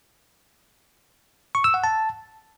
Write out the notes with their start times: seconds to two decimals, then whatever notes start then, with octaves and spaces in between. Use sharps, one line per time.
1.55 C#6
1.64 E6
1.74 F#5
1.84 A5